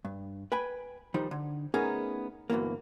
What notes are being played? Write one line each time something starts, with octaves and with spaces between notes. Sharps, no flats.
G2
B4 G5 G#5 B5
D#3 F3 G3 D#4
D3
A3 B3 C#4 D#4 G#4 A#4
D2 G2 B2 E3 A#3